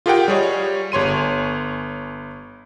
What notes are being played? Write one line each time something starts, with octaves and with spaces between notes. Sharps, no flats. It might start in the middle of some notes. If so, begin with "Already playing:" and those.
F4 G4 G#4 A#4 F#5 G5
G3 G#4 C#5 D#5
G1 C#5 C6 D#7